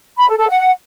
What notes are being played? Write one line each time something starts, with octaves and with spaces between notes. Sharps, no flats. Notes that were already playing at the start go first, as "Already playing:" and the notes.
B5
A4
A4
F#5